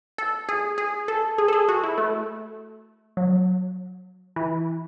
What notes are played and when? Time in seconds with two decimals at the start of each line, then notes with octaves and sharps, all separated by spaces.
0.18 A4
0.49 G#4
0.78 G#4
1.08 A4
1.38 G#4
1.48 A4
1.53 G#4
1.69 F#4
1.84 E4
1.98 A3
3.17 F#3
4.36 E3